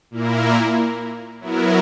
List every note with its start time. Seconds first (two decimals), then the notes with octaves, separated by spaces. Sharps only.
0.11 A#2 A#3 E4 A#4
1.40 F#3 B3 E4 A#4